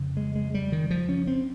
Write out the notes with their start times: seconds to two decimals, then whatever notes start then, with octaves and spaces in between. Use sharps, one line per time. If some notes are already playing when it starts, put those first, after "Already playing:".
Already playing: F2 C#3
0.17 G#3
0.36 G#3
0.54 G3
0.72 D#3
0.91 F3
1.09 C#4
1.27 C4